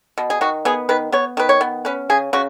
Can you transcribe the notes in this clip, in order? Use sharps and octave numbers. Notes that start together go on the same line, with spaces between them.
B2
G#4
D#3 F#4
B3 G#4
D#3 B4
B3 C#5
D#3 B4
C#5
B3
C#4 B4
C#3 G#4
C#3 F#4